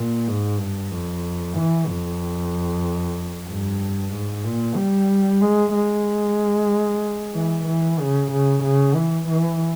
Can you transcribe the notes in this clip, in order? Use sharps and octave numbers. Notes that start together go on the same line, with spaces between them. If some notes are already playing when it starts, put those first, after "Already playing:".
Already playing: A#2
G#2
G2
F2
E3
F2
G2
G#2
A#2
G3
G#3
G#3
E3
E3
C#3
C#3
C#3
E3
E3